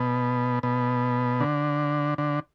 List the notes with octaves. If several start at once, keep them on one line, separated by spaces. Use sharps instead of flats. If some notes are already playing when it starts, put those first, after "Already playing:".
Already playing: B2
B2
D3
D3